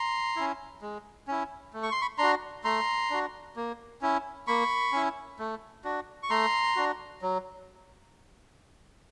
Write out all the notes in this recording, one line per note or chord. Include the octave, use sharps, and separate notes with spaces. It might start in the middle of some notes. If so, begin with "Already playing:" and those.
Already playing: A#5 C6
C#4 E4
G#3
C#4 E4
A3
C#6
C6
B5 C#6
D4 F#4 A#5 C6
A3 A#5 C6
D4 F#4
A#3
C#4 E4
A#3 B5 C#6
C#4 E4
A3
D4 F#4
C#6
A3 A#5 C6
D4 F#4
F#3